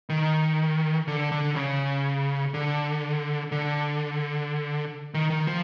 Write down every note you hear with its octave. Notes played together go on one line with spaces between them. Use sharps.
D#3
D3
D3
C#3
D3
D3
D#3
D#3
F3